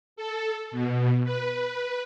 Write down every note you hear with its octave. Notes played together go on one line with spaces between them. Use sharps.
A4
B2
B4